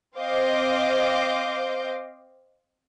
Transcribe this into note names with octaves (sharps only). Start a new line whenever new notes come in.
C4 C5 D#5 F5 D6 G6